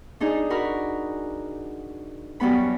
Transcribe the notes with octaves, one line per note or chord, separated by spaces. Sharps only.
D4 D#4 G#4
F#4 A#4 B5
F#2 F#3 G3 B3 B5